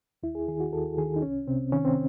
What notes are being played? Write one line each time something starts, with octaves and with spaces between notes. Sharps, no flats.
D#2 E4
G#4
D#3 G#4
F#4
D#2 A4
D#3 G#4
D#4
C2 C#4
C3 C4
D#3 C#4
C4